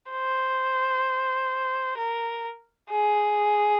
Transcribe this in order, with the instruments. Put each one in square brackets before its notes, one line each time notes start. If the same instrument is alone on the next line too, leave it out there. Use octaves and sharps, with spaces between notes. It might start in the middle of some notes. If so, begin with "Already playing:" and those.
[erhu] C5
A#4
G#4